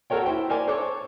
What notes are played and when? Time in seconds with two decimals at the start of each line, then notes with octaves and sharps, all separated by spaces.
0.10 F#4 A4 A#4 C#5 G5
0.25 E4 C5 G5
0.49 A#4 C5 D5 G#5
0.67 A4 C5 C#5 C#6 D6